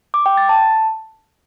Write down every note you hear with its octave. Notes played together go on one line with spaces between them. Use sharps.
D6
G5
A6
A5